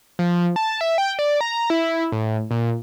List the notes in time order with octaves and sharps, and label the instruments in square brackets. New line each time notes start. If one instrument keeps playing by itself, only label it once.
[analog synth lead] F3
A5
E5
G5
D5
A#5
E4
A2
A#2